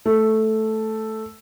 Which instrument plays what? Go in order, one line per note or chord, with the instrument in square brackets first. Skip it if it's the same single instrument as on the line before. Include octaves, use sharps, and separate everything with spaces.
[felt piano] A3